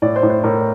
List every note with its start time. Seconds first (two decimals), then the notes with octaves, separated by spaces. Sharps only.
0.02 A2 D5
0.16 C5
0.23 A2
0.30 C5
0.43 A2 A#4